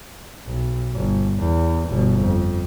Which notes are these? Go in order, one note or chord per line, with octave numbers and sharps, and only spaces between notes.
B1
G1
E2
G1 B2
F2